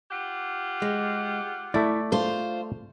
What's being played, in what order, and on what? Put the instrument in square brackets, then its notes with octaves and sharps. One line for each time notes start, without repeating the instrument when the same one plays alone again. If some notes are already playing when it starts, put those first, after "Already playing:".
[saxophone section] F4 G4 F#5
[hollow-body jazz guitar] G#3
[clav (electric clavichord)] A3 D5 [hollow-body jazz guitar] E4
[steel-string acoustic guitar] F4 C5 [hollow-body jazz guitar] A4